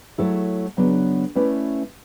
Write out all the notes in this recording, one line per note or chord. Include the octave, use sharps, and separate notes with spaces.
F#3 A3 E4 A4 C#5
C#3 F#3 B3 D4
A3 C#4 E4 B4 D5